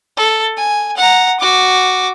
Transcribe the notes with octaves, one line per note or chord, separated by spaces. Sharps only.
A4
G#5
F#5 A#5
F#4 D6